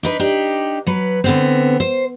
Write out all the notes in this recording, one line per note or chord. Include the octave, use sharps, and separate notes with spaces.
D4 D#4 B4
D4 D#4 G4
F#3 B4
D3 B3 C4
C5